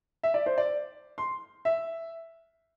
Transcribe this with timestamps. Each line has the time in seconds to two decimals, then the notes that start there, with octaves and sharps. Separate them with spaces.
0.23 E5
0.34 D5
0.46 C5
0.58 D5
1.18 C6
1.65 E5